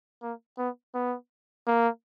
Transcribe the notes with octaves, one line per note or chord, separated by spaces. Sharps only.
A#3
B3
B3
A#3